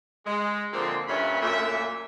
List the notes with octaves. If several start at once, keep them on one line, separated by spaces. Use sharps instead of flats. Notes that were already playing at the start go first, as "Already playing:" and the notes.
G#3
A#2 D3 F3 A#3 C4
G2 A#2 C#4 E5 B5 C6
F#2 A#2 A3 A#3 E5